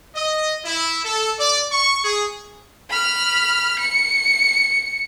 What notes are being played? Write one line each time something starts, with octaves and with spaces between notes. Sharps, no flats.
D#5
E4
A4
D5
C#6
G#4
B5 F6
C#7